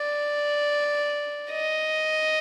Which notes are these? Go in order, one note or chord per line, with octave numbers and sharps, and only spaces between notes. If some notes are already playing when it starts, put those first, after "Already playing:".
Already playing: D5
D#5